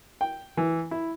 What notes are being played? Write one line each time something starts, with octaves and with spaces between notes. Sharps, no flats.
G5
E3
E4